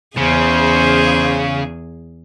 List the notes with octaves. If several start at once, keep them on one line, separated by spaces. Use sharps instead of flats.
E2 C#3 G#4 C5